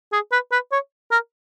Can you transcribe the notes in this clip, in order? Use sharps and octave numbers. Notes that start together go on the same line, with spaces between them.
G#4
B4
B4
C#5
A#4